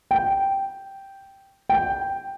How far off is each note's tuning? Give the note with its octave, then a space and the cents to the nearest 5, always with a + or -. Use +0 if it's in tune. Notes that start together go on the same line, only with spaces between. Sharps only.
G5 -5
G5 +0